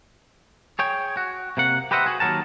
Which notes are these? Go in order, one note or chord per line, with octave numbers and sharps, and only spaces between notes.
G#4 C#5 G5
F#4
C3 A#3 F#5
G4 B4 C5 D#5 E5 F#5
F#4 G#4
D#2 F3 F#3 A#4 A5